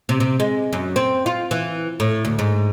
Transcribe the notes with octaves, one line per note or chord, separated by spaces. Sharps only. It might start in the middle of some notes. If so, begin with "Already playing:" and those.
C3
C3
G#3
F#2
C4
F4
E3
A2
D2
G#2